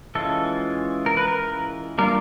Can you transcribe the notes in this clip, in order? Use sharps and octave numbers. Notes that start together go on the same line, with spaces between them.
E3 G#3 C#4 F4 A4
A#4
B4
A#4
G3 A#3 D4 F4 A#4